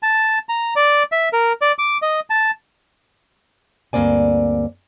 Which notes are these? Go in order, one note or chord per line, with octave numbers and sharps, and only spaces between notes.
A5
A#5
D5
E5
A#4
D5
D6
D#5
A5
D2 G2 A#3 C4 D5 G#5